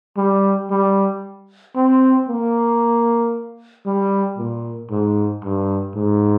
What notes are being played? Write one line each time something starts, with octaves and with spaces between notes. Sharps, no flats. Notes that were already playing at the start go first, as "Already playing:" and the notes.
G3
G3
C4
A#3
G3
A#2
G#2
G2
G#2